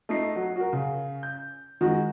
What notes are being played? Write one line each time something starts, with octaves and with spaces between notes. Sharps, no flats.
A3 D#4 C7
F#3
F#4 A#4
C#3
G6
D#3 G#3 F#4